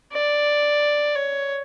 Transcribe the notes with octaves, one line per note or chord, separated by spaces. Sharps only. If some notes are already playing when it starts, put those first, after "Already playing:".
D5
C#5